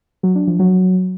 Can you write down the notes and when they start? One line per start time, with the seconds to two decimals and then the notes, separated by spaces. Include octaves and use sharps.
0.23 F#3
0.35 D4
0.47 F3
0.59 F#3